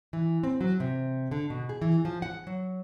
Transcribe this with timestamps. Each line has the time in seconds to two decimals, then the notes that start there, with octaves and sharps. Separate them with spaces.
0.13 E3
0.43 C4
0.61 F#3
0.80 C3
1.31 D3
1.50 B2
1.69 G#4
1.82 E3
2.05 F3
2.22 F#5
2.47 F#3